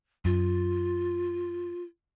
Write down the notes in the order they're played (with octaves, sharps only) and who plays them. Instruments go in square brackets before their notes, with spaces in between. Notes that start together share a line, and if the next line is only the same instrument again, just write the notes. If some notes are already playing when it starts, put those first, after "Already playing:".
[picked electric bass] F#2 [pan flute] F4